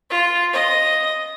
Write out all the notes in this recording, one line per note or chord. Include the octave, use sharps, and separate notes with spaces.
F4
D#5